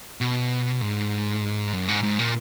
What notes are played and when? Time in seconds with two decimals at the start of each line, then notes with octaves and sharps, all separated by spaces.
0.21 B2
0.81 G#2
1.73 F#2
1.88 G#2
2.03 G#2
2.19 A#2